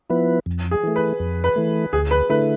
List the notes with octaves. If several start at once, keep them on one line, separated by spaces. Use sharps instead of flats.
F3 B3 E4 B4
F2
G#4
E3 A3
B4
F2
B4
E3 A3
D2 G#4
B4
D3 A3 E4 B4